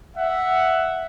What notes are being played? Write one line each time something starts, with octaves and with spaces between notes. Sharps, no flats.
E5 F#5